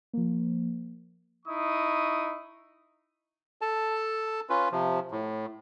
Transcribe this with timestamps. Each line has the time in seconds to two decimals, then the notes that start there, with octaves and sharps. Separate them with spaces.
0.13 F3 A#3
1.46 D#4 E4 C#6 D#6
3.62 A4 A5
4.49 C#4 F4 B4
4.72 C3 F3
5.11 A2